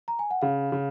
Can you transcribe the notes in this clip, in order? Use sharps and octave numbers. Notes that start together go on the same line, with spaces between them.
A#5
G#5
F#5
C#3 F5
C#3